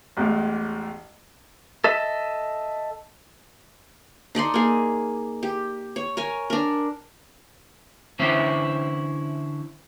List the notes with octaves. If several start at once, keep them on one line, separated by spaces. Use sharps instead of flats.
A1 E2 A2 G#3
A4 D#5 E5
D#4 A4 D5 C6
A#3 G#4
G4
C#5
A#4 C#5 G#5
D4 A#4
D3 E3 C#4 E4 C5 E5